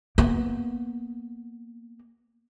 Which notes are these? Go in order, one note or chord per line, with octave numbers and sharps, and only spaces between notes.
A#3 B3